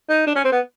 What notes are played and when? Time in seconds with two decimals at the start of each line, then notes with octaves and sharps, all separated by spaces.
0.09 D#4
0.27 D4
0.35 C#4
0.44 C4
0.52 B3